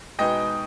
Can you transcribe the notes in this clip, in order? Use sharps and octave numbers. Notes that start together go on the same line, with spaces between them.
B2 G#3 B3 D#4 D#5 G5